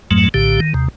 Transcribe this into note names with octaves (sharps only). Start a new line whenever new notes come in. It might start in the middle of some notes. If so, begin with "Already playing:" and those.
F2 G#2 F#3 A3
A#1 A2 D3 G4
D#3
D#2 C3